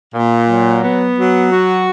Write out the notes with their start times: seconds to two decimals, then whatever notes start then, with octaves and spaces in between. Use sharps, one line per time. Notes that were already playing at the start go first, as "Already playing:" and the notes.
0.14 A#2
0.48 F#3
0.82 B3
1.17 F#3
1.51 F#4